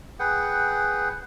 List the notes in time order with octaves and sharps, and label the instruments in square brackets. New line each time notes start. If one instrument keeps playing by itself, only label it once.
[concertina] G#4 B4 F#5 G5